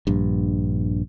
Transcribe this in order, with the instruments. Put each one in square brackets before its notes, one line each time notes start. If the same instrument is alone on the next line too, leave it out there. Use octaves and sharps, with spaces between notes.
[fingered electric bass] A#1 G2